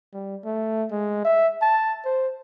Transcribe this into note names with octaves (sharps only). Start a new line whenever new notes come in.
G3
A3
G#3
E5
A5
C5